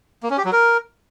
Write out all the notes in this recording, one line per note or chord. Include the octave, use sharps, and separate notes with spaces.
A#3
C#4
G4
F#3
A#4